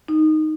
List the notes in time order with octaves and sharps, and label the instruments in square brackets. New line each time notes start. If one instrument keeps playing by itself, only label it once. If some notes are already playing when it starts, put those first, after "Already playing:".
[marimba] D#4